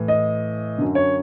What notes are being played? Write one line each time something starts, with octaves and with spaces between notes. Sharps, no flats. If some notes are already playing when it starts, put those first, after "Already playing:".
Already playing: A2 E3
D#5
F#2 D3
C#5